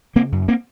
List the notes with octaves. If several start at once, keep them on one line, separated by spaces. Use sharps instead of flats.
C#3 A#3 C4
F#2
A#3 C4